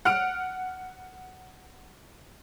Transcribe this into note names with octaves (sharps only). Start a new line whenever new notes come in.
F#5 F6 D7